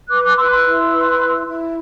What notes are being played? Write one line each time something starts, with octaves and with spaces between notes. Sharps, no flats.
B4 D6 F#6
D6 F#6
B4 C6 E6
C6 E6
E4
B4
E4
E4